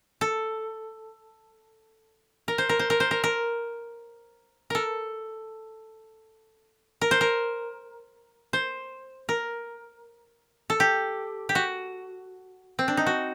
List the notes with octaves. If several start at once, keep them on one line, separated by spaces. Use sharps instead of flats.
A4
A#4
C5
A#4
C5
A#4
C5
A#4
A#4
A4 A#4
A#4
C5
A#4
C5
A#4
A4
G4
G4
F#4
C4
D4
D#4
F#4